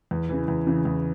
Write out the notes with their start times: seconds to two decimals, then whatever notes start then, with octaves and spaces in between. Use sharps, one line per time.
0.11 E2
0.29 C#3 E3
0.48 E2
0.67 C#3 E3
0.85 E2